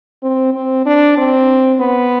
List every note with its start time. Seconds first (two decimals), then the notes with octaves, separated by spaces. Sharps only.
0.23 C4
0.54 C4
0.86 D4
1.17 C4
1.80 B3